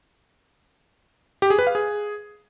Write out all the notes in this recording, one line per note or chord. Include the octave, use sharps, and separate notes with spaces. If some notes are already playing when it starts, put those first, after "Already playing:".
G4
G#4
B4
F5
G#4